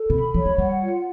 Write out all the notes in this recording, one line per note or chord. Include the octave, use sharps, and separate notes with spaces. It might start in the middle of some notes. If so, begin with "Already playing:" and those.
Already playing: A4
C3 B5
F3 C#5
G#3
G3 F#5
F4